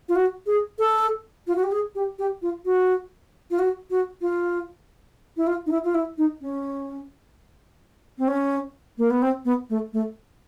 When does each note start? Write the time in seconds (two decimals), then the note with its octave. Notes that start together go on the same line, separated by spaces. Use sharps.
0.09 F4
0.16 F#4
0.46 G#4
0.79 A4
1.47 F4
1.56 F#4
1.63 G4
1.72 G#4
1.95 G4
2.19 G4
2.42 F4
2.65 F#4
3.51 F4
3.59 F#4
3.90 F#4
4.21 F4
5.37 E4
5.47 F4
5.66 D#4
5.71 E4
5.84 F4
5.94 E4
6.18 D#4
6.41 C#4
8.18 C4
8.28 C#4
8.98 A#3
9.10 B3
9.22 C4
9.45 B3
9.70 A3
9.93 A3